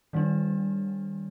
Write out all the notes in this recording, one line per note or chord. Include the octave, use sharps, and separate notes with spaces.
D#3 G3 D4